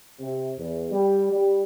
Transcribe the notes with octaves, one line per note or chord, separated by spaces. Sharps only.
C3
E2
G3
G3